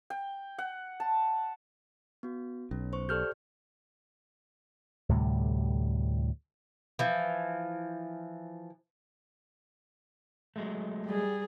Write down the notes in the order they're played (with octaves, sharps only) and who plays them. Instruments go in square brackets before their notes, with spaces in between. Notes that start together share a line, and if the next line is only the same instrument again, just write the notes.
[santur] G5
F#5
A5
[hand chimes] B3 F#4
[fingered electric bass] B1 [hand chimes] C#4
[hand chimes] C5 C#6
[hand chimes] G4 D5 [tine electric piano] A4 F6 G6
[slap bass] D2 A2 C3 G3
[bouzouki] E3 F3
[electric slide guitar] F#3 G#3 A3
[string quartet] G3 G#4